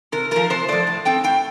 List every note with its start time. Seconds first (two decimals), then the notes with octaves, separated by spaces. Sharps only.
0.12 C3 A#4
0.31 F3 A3 A#4
0.50 C3 C5
0.68 F3 A3 D5
0.87 A2
1.05 A3 C4 G5
1.24 A2 G5